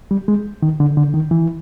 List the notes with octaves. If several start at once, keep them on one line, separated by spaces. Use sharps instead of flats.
G3
G#3
D#3
D3
D3
D#3
E3